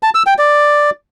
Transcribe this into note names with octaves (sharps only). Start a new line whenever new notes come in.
A5
E6
G5
D5